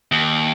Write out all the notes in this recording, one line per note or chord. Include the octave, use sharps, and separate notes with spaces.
D#2